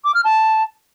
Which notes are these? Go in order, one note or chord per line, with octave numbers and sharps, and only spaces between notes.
D6
F6
A5